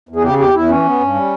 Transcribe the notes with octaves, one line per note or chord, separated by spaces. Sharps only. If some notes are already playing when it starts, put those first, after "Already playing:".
E2
G#4
C#3 G4
E2 G4
E2 E4
E3 C#4
B3
G2
G3